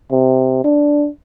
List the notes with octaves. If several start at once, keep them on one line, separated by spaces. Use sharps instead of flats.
C3
D4